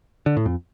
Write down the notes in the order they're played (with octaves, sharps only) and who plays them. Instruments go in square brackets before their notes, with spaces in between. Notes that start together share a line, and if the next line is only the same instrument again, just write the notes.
[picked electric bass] D3
A2
F2